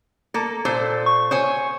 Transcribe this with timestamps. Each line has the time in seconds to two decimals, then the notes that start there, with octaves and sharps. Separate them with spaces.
0.34 A#3 A4
0.65 A#2 A4 C5
1.06 C#6
1.31 C5 C#5 G#5